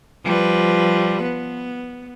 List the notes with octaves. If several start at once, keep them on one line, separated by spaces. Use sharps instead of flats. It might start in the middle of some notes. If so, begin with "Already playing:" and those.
F3 G3 B4
B3